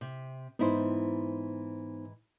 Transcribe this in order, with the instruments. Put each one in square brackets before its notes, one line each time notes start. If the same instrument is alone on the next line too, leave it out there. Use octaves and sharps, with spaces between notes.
[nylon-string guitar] C3
[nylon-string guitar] G#2 E3 E4 [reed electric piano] B3 D#4 C5